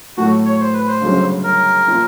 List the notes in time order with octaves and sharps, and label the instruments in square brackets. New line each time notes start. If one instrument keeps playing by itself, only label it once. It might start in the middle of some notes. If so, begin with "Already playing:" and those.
[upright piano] A2 F#3 A3 [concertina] F#4
[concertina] C#5
C5
B4
C5
[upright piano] G1 F#2 C#3 F#3
[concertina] A#4
[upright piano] A#2 F3